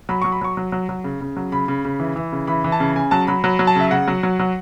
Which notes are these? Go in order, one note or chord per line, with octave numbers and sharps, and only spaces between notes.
F#3 B5
F#3 C#6
B5
F#3 C#6
F#3
F#3
F#3
C#3
C#3
F#3
C#3 B5
C#3
C#3
E3
E3
C#3
E3 B5
E3
A5
C#3
C#3 G#5
F#3 A5
F#3 B5
F#3 B5
F#3
A5
C#3 E5
C#3 F#5
F#3
F#3
F#3